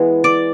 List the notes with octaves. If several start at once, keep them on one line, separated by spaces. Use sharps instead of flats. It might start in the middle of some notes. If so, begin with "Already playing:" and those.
Already playing: E3 G#3 B3
D5